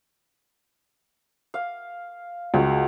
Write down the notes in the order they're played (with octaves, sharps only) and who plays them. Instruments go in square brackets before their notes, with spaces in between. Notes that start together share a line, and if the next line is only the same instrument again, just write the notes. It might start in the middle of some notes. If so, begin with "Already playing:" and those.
[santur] F5
[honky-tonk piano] C#2 [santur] F#4